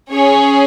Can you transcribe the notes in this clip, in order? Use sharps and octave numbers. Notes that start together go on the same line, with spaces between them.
C#4 G#4 C#5